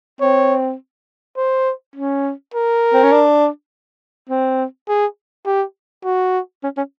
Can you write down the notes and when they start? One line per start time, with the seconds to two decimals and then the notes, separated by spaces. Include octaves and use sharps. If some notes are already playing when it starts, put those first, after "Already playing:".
0.21 C4 C#5
1.37 C5
1.96 C#4
2.54 A#4
2.94 C4
3.04 C#4
3.12 D4
4.30 C4
4.88 G#4
5.46 G4
6.04 F#4
6.63 C#4
6.77 C#4